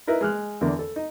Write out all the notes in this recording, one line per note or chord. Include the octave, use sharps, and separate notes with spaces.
D#4 E4 A#4 B4 E5
G#3 F6 F#6
E2 D3 A#4
A4
D#4